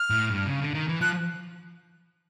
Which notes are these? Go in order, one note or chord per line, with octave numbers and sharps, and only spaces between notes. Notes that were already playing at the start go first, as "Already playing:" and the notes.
Already playing: F6
A2
G2
C#3
D3
D#3
E3
F3 F#6